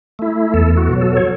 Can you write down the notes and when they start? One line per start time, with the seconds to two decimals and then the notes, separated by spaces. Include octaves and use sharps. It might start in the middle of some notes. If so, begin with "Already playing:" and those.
0.19 A3 E4
0.54 E2 A4
0.77 F#4
0.89 B2 F#3
1.01 A4
1.17 C#5